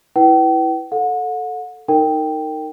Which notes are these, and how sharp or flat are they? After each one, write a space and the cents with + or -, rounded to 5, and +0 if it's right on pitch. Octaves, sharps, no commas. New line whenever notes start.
E4 +0 B4 +0 G5 -40
A4 +0 F#5 -35
D#4 +0 A#4 -25 G5 +0